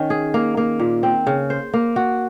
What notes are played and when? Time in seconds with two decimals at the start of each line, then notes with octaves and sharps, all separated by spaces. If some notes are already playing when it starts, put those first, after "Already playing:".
Already playing: D#3 C#4
0.10 G#4
0.34 A#3
0.57 A#3
0.80 A#2
1.03 C4
1.27 C#3
1.50 C5
1.74 A#3
1.96 F#4